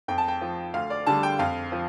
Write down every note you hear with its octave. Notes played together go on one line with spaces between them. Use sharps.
F2 G5
A5
G5
F3
D2 F5
D5
D3 G3 A5
G5
F2 F5
F3